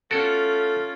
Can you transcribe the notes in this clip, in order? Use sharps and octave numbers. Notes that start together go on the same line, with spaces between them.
A3 C#4 F4 F#4 A4 A6 D7